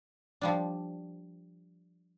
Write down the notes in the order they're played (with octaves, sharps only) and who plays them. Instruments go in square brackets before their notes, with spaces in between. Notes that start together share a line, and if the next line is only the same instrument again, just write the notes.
[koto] F3 G3 D4